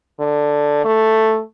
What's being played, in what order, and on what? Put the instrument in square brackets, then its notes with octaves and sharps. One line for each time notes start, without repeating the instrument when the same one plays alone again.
[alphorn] D3
A3